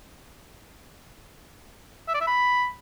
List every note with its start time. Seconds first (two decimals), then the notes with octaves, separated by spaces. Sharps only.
2.08 E5
2.14 D5
2.21 E5
2.27 B5